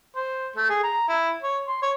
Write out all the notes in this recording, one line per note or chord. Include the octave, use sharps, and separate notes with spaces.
C5
A3
G#4
A#5
E4
C#5
C6
C#5